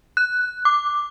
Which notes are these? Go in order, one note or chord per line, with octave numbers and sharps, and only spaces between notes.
F#6
D6